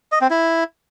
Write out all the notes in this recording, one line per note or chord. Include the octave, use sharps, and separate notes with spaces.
D#5
C4
E4